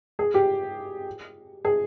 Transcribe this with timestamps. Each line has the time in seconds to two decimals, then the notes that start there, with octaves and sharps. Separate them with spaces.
0.19 G#4
0.34 G4
1.65 G#4